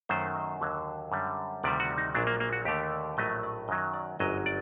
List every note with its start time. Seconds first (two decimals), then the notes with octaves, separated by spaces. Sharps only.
0.09 F#2 D#3 F#3 A3 C5
0.36 D#5
0.60 D#2 D3 F#3
1.12 F#2 D3 G3
1.63 D2 C3 D#3 G3 D5
1.80 F#4
1.98 D#4
2.14 A#1 A#2 F#3 D4
2.27 A#3
2.40 A#3
2.53 F#4
2.65 D#2 D3 A3 G4
2.92 D5
3.17 A#1 A2 F#3 A3 D#5
3.43 D5
3.68 F#2 D#3 F#3 D#5
3.93 D5
4.19 G1 F#2 F#3 D#5
4.46 D5